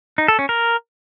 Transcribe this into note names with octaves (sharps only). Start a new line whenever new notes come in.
D#4
A4
C#4
A#4